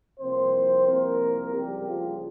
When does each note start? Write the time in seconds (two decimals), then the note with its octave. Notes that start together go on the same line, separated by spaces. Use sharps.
0.20 C2 C3 F3 A#3 C4 C5
0.88 A#3 A#4
1.54 C#2 C#3 F3 G3 G4
1.88 F3 F4